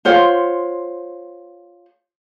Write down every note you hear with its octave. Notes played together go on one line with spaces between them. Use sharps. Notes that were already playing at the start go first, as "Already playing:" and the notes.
F4 C5 C#5 F#5